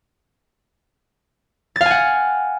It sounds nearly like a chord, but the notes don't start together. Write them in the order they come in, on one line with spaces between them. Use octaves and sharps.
A6 F5 G#5 F#5